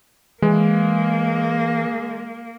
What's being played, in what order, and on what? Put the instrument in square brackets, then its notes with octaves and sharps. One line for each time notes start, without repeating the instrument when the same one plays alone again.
[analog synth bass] E3 [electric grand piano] G#3 [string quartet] A#3